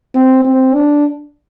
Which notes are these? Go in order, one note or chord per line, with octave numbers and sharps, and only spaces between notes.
C4
C4
D4